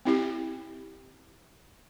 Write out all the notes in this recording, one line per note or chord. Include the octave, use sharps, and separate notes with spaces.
C4 E4 G4